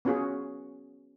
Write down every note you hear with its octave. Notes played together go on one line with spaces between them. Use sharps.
B3 C#4 F4 F#4 G#4